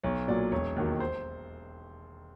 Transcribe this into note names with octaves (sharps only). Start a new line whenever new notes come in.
B1 C#5
A#2 F#3 D5
E1 C#5
D#2 D#3 F#3
C5